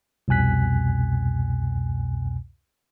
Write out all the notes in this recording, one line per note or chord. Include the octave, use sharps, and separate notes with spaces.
C2 F2 B2 G#5 F#6 B6